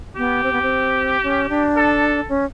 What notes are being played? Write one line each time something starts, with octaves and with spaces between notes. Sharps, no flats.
B3 G4
C4
B3
C4
C#4
D4
A4
C#4